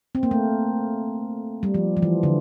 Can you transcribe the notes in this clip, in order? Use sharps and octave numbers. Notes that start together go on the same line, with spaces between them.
C4
A#3
A3
G3
F3
F3
E3
D3